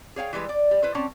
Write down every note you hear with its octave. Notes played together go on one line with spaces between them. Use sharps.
G#4 C#5 F5 G5
E3 G3 G#3 B4
D5
G3
E4 B4 C5
C4 C#4 D5 A5